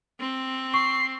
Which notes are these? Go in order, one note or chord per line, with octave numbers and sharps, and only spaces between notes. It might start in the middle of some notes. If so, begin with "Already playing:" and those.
C4
C#6 C7